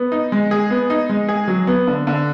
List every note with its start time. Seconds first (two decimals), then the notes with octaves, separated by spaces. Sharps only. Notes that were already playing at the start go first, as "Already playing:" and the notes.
Already playing: B3
0.12 D#4
0.32 G#3
0.51 G#4
0.71 B3
0.90 D#4
1.09 G#3
1.28 G#4
1.48 F#3
1.67 B3
1.87 D3
2.07 D3